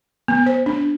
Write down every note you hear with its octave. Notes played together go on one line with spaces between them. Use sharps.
B3
C5
D4